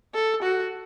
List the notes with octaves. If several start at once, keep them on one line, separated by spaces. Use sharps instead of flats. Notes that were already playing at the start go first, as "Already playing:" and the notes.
A4
F#4